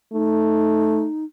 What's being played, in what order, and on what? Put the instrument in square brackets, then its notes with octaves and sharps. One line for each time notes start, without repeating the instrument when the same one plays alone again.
[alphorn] A3 [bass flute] D#4